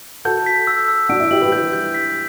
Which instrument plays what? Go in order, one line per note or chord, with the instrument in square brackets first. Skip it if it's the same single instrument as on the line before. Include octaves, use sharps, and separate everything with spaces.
[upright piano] F#4 A4 [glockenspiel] G6
[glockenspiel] B6
E6
E6
[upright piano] D4 F#4 [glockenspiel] D7
[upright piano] E4
[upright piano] E4 G4 [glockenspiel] F#7
[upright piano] G4 B4
[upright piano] G4 B4 [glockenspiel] G6
[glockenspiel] G6
B6